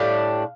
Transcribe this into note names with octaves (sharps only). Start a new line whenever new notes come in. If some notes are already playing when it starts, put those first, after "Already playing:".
Already playing: A2 G3 D4 F5